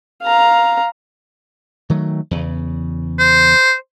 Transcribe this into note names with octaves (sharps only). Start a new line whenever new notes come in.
F5 A#5
D#3 F#3 A3
E2 C#3
C5